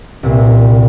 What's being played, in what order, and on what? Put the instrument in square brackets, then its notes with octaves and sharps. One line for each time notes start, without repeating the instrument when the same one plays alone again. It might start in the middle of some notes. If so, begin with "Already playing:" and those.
[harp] C2 A#2